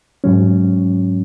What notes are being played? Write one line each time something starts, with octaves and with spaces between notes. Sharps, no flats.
G#2 F#3 C#4